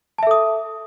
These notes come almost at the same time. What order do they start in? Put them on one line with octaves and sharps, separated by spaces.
A5 E5 A4 D#6